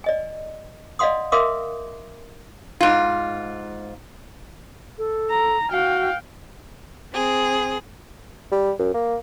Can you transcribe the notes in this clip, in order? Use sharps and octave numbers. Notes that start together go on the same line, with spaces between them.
D5 D#5 G#5
D5 D#5 F5 F#5 C6 D#6
A#4 E5 F5 C6 D6 D#6
G#2 F4
A4
A#5
F#4 F5 G5
C4 G#4
G3
F#2
A#3